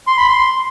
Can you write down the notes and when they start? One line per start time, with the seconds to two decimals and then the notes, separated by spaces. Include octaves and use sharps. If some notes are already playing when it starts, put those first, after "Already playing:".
0.07 C6
0.17 B5
0.27 C6